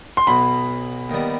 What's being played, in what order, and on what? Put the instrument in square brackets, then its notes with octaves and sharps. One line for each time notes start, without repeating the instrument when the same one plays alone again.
[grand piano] C6
[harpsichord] B1 B2 F#3 [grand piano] B5
[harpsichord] D#2 D#3 G3 B3